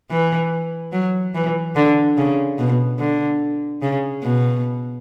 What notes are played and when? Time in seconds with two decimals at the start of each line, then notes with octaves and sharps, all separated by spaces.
0.11 E3
0.93 F#3
1.35 E3
1.76 D3
2.17 C#3
2.59 B2
2.99 D3
3.82 C#3
4.23 B2